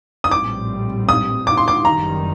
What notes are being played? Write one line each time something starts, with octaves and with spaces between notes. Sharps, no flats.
D#6
A#1 A2 G3 C4 D6
D#6
D6
C6
D6
F#1 F#2 D#3 G3 A#5